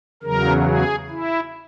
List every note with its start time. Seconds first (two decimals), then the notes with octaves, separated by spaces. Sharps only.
0.23 E2 C#3 F#3 A#4
0.66 G#4
1.10 E4